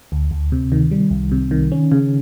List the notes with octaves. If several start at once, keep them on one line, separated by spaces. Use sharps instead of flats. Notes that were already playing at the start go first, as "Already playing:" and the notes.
D2
D2
C3
D#3
G3
C2
C3
D#3
C#4
C#3